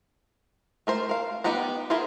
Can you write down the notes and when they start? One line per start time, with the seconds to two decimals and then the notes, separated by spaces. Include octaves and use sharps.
0.87 A3 A#4 C5
1.09 A#4 F5
1.44 B3 D#4 G4 F#5 A#5
1.90 E4 F4 G#4 A#4 C5